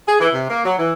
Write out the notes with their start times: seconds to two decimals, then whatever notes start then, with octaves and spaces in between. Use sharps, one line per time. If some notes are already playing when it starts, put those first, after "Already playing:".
0.08 G#4
0.20 E3
0.34 C3
0.49 A#3
0.65 F#3
0.78 E3